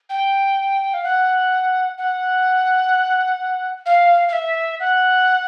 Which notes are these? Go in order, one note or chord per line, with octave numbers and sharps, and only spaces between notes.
G5
F5
F#5
F#5
F5
F5
E5
F#5